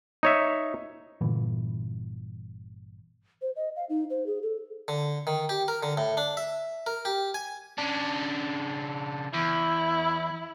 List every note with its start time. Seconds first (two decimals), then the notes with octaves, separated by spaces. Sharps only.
0.23 D#4 C#5 E5
1.21 G1 A#2 D3 E3
3.42 C5
3.56 D#5
3.76 F5
3.89 D#4
4.10 C5
4.26 G#4
4.42 A4
4.88 D3
5.27 D#3
5.49 G4
5.68 A#4
5.83 D3
5.97 A2
6.17 D4
6.37 E5
6.87 A#4
7.05 G4
7.34 G#5
7.78 C#3 D4
9.34 E2 E4